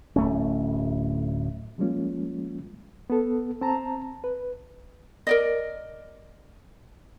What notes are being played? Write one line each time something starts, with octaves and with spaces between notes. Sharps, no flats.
D1 A3 C#4
F3 G3 G#3 A#3 C#4 F4
B3 A4
C4 A5 A#5
B4
A#4 D5 D#5